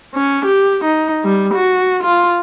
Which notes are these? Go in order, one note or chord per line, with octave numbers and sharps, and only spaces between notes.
C#4
G4
D#4
G3
F#4
F4